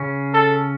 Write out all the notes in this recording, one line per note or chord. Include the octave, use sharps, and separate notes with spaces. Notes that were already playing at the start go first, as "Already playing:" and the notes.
Already playing: C#3 C#4
A4